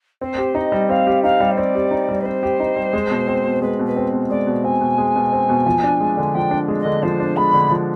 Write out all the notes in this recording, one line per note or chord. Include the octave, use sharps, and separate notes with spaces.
C4 C5
G4
D#4 D#5
G3
C4 F5
G4
D#4 F5
G3
C5
C4 D5
G4
D#4
G3
B4
C4 C5
G4
D#4
G3
G#3
B2
C4
B2
G#3 B4
B2
B4
C4
B2
G#3 D5
B2
C4 G#5
B2
G#3
B2
C4
B2
F3
D4
G#3
D3
F3 G5
D4
G#3
D#5
D3
F3 C5
D4
G#3 B5
D3
F3